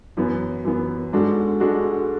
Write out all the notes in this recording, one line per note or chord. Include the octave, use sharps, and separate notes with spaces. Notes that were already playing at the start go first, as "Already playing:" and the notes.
F#2 E3 B3
F#2 E3 B3
G#2 G#3 D4 F#4 A4
G#3 D4 F#4 A4